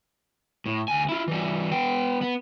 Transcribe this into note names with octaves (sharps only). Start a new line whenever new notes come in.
A2
D2 G#5
E4 F4
E3 G3
B3 G5
B3